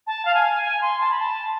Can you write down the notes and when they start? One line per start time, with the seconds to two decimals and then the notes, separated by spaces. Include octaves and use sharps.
0.07 A5
0.25 F5
0.35 G#5
0.63 G#5
0.82 C6
1.01 A5
1.11 B5
1.20 A5